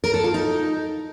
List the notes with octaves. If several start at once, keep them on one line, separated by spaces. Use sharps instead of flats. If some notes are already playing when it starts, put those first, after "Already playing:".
A#4
A4
F4
D#4